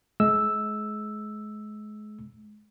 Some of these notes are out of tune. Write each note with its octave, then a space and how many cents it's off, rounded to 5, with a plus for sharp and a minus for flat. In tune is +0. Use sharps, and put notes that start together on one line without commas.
G#3 +35 E6 +0